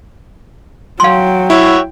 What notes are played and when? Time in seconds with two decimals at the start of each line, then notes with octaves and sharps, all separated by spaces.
1.00 F#3 F5 G5 C6
1.50 E4 F#4 C#5 E5